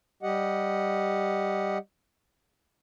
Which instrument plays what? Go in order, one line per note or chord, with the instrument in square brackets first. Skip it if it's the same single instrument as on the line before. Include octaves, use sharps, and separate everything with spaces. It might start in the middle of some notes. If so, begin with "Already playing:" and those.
[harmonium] G3 G4 D#5 F#5